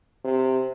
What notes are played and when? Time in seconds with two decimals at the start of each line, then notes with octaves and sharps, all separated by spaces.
0.25 C3